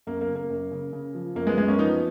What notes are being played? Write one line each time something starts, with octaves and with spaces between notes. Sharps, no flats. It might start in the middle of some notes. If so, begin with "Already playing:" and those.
F#2 A#3
A#3
C#3
A#3
F#2
C#3
C#3
F3
F#2 A#3
G#3 B3
F#2 G#3 B3
A#3 C#4
F3 B3 D#4